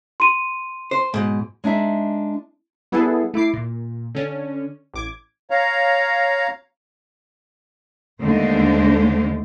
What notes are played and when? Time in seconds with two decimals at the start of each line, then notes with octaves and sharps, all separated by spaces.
0.20 C6 D#7
0.91 C5
1.14 G#2 B2
1.64 G#3 D4 D#4 E5
2.92 G3 B3 E4 G#4 A4
3.34 A3 E4 D6 C7
3.54 A#2
4.15 D3 C#4 D4
4.94 A1 D6 G#6
5.50 C#5 F5 A#5
8.21 D#2 D3 G#3 A3 D4 C5